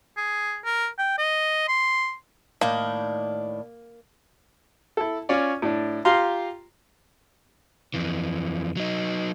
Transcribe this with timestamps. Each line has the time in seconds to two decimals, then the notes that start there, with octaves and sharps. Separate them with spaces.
0.17 G#4
0.64 A#4
0.99 G5
1.18 D#5
1.68 C6
2.61 A2 D#3 A#3 D4
4.97 E4 A4
5.29 C#4 F4 C#5 D5
5.62 A2 D4
6.05 F4 G4 F5 A#5 C6
7.94 F2 E3
8.77 F#3 D#4